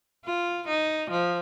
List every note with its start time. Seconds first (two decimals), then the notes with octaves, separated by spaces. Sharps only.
0.25 F4
0.68 D#4
1.10 F3